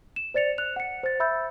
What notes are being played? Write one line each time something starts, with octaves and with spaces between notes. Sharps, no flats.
E7
C5 D5 A6 C#7 F7
F#6 F7
F#5 C#7
C5 A6
E5 B5 E6 G6 A6